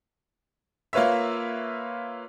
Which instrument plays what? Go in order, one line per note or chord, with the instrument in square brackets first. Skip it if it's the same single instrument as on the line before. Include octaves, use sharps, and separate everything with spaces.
[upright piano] A#3 F4 B4 C#5 E5